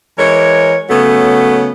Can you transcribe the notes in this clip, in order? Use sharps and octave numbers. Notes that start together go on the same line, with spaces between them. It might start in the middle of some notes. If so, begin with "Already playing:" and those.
E3 G#3 A#4 C#5
C#3 F#3 A3 B3